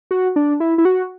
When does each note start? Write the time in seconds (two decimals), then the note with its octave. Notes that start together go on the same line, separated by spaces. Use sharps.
0.11 F#4
0.36 D4
0.60 E4
0.78 E4
0.85 F#4